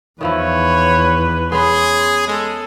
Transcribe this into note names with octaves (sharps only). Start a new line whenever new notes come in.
E2 D#3 F3 E4 B4 C#5
B3 C#4 G#4 B4 C6
G#3 A4